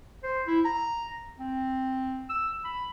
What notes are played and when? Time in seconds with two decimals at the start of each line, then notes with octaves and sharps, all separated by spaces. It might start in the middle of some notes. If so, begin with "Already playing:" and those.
0.23 C5
0.47 E4
0.65 A#5
1.39 C4
2.29 E6
2.65 B5